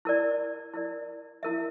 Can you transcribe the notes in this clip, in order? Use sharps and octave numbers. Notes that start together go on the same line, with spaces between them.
E4 A#4 D5
E4 A#4 D5
E4 A#4 E5